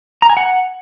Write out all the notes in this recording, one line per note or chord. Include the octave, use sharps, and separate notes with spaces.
A#5
G#5
F#5